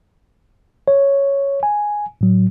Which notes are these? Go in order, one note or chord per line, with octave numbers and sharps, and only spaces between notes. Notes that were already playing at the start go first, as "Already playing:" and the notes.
C#5
G#5
A2 F#3